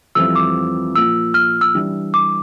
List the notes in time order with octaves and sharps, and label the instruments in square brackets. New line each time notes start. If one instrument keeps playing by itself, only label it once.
[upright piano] F2 E3 G3 C4 F4 [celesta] E6
[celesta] D6
[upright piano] A#2 F3 A#3 F4 [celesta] E6
[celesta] F6
E6
[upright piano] E3 G3 D4
[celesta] D6